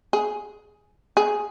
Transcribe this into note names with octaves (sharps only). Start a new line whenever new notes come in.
G#4
G#4